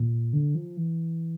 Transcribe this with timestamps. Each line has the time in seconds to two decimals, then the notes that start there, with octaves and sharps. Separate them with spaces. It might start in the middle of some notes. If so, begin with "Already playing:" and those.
Already playing: A#2
0.33 D3
0.55 F3
0.77 E3